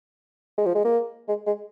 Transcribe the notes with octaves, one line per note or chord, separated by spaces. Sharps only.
G#3
F3
G#3
A#3
G#3
G#3